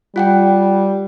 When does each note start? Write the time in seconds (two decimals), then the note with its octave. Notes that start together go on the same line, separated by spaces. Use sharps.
0.16 G3 F4 F#5 G5